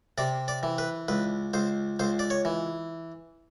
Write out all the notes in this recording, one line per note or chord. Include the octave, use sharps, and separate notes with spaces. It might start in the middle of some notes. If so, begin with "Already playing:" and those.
C3 D5
D5
E3
B4
C#2 B4
C#2 C5
C#2 C5
D5
C#5
E3